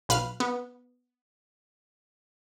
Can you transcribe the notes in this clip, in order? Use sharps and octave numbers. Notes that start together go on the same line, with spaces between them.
B1 B4 F5 F6
B3